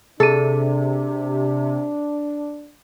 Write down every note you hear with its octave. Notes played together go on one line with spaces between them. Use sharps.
C3 D4 G#4 A4 D#7